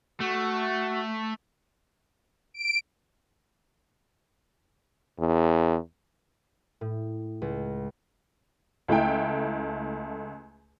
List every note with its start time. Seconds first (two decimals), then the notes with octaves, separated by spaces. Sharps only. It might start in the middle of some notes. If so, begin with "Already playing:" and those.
0.21 A3 F#4
2.54 D7
5.19 E2
6.81 A2
7.42 C#2
8.88 C#2 A3 E4 G5